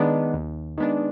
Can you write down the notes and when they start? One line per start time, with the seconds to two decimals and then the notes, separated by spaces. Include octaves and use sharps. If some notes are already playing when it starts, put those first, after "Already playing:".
Already playing: D#3 G#3 B3 D4
0.34 D#2
0.77 D#3 G#3 B3 D4